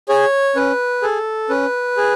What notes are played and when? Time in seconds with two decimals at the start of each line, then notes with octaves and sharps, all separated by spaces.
0.09 G#4 C#5
0.56 C#4 B4
1.02 G#4 A4
1.49 C#4 B4
1.97 G#4